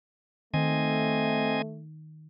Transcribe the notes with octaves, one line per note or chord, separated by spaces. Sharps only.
D#3 A3 C4 D#5 G#5